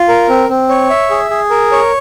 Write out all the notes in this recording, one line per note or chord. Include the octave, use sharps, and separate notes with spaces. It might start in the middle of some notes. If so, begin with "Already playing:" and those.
Already playing: F4
A#4
C4
C4
C#5
E5
G#4
G#4
A#4
C#5